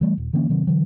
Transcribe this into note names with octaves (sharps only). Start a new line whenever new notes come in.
E3 G3 A3
D#1
D3 E3 A#3 C#4
C3 D#3 F#3 C4
D3 E3 F#3